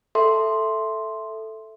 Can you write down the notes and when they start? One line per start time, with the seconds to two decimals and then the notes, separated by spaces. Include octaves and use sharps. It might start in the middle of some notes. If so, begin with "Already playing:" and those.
0.15 A4 E5 C6